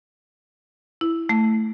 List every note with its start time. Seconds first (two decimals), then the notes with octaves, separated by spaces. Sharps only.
1.01 E4
1.29 A3